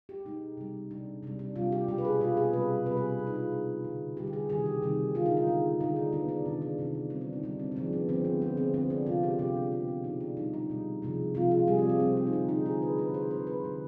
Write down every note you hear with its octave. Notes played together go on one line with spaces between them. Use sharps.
G4
B2 G#3 D#4
C3 G3
C3 G3 D4
C3 G3 D4
D4
C3 G3 F4
G4
B2 G#3 G4
B4
G#4
B2 G#3 F4
G#4
C3 G3 B4
C3 G3 B4
G#4
D4
C3 G3
D#4
F4
C3 G3
D3 G3
D3 G3 G4
G4
G#4
C3 D#3 G3 G#4
G4
C3 D#3 G3
D3 G#3 F4
D#4
F4
D3 G#3
D3 G#3 D#4
D4
D3 G#3 B3
D4
C3 D#3 G#3 D#4
D4
C3 D#3 G#3
B3
D3 G3 C4
D4
D#4
D3 G3 D4
C4
C4
D3 F3 G#3 D4
B3
D3 F3 G#3 C4
B3
D3 G#3 B3
C4
D3 G#3 C4
D4
C3 F3 G#3 F4
G4
C3 F3 G#3 G4
C4
B2 G#3 B3
C4
B2 G#3 D#4
D4
B2 G3 D#4
D#4
B2 G3
C3 F3 G#3
C3 F3 G#3 F4
F4
C3 G3 G#4
C4
C4
C3 G3 C4
C4
D#4
D3 G#3 D4
D#4
D3 G#3 G#4
B4
D3 G#3 B4
C5
D3 G#3 C5
B4
D3 G#3